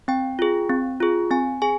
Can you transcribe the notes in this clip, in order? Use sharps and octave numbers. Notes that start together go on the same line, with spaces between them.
C4 G5
F4 G#4
C4
F4 G#4
C4 G#5
G#4 G#5